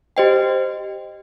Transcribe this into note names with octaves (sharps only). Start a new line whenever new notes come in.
G4 C5 D#5 G5